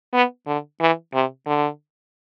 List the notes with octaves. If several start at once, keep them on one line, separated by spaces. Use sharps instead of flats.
B3
D3
E3
C3
D3